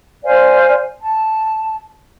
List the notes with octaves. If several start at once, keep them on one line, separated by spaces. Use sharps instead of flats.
C5 D5 F5 G#5
A5